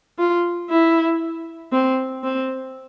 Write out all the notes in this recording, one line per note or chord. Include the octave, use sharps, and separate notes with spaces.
F4
E4
C4
C4